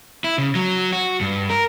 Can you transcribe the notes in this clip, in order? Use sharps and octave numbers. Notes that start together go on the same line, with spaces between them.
E4
C#3
F#3
F#4
G2
A#4